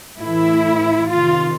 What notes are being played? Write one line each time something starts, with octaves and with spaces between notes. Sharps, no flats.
A2 E3 E4
C3 D#3 F4